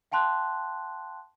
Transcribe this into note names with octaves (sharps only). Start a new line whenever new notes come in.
F5 G5 A5 C6 F#6